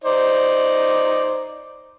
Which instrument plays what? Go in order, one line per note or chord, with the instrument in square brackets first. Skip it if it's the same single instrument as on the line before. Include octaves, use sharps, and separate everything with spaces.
[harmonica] D#4 C5 D5